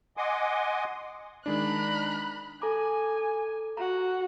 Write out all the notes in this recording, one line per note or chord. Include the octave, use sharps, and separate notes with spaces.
D#5 F#5 G#5 C6 D6 D#6
D#3 G#3 D4 A#5 B5 F#6
A4 G#5 A#5 D6
F#4 A#5